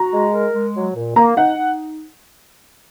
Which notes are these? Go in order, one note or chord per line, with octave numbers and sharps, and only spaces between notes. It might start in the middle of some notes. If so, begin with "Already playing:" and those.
Already playing: F#4 A#5
G#3
A#4
G#3
F#3
A#2
A#3 A#5
D#4 F#5
D#4